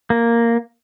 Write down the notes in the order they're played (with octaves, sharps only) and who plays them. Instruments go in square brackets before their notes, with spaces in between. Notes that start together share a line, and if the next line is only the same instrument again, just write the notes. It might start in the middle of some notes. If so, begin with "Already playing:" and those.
[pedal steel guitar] A#3